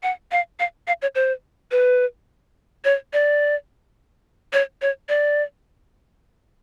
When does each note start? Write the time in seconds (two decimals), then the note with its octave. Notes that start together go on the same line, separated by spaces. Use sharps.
0.03 F#5
0.32 F5
0.59 F5
0.87 F5
1.02 C#5
1.15 C5
1.71 B4
2.84 C#5
3.13 D5
4.53 C#5
4.82 C#5
5.09 D5